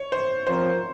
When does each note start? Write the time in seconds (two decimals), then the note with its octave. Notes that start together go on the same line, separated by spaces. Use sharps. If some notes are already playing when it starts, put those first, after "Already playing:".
Already playing: C#5
0.12 C5
0.47 F3 C4 F4 A#4 C5 C#5